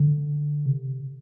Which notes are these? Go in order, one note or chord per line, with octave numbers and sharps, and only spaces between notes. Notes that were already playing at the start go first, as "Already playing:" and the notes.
Already playing: D3
C3